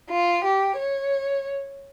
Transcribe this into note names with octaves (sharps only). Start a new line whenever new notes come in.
F4
G4
C#5